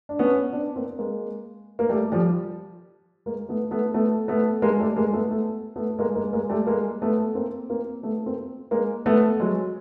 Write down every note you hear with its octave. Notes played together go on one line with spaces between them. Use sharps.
D4
B3 C#4
C4 D4
A#3 C4
G#3 A#3
A#3
G3 A3
F3 G3
G#3 A#3
A3 B3
A3 B3
A3 B3
A3 B3
G#3 A#3
G3 A3
G#3 A#3
A3 B3
A3 B3
A3 B3
G#3 A#3
G#3 A#3
G#3 A#3
G3 A3
G#3 A#3
A3 B3
A#3 C4
A#3 C4
A3 B3
A#3 C4
G#3 A#3
A3 B3
F#3 G#3